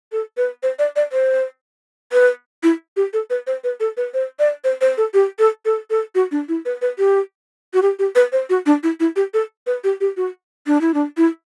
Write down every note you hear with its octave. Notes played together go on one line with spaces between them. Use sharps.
A4
B4
C5
D5
D5
C5
B4
E4
G4
A4
B4
C5
B4
A4
B4
C5
D5
C5
C5
A4
G4
A4
A4
A4
F#4
D4
E4
B4
B4
G4
F#4
G4
G4
B4
C5
F#4
D4
E4
E4
G4
A4
B4
G4
G4
F#4
D4
E4
D4
E4